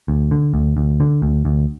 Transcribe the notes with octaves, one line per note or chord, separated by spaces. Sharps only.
D2
D3
D2
D2
D3
D2
D2